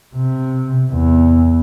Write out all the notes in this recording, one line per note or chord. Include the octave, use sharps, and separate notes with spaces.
C3
E2